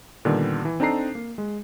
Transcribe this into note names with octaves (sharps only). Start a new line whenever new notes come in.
A#2 D3 D#3 G3 B3
E3
C4 D4 D#4 A4 A#5 C7
A#3
G#3